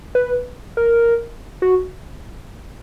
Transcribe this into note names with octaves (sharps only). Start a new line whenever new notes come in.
B4
A#4
F#4